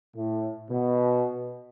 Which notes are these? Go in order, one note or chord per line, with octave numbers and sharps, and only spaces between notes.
A2
B2